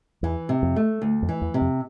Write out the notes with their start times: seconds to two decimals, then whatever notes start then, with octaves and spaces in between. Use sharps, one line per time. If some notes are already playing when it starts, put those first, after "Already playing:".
0.23 E2 E3
0.49 C3
0.63 F2
0.76 A3
1.02 D2
1.22 F2
1.29 E3
1.42 E2
1.54 C3
1.61 F2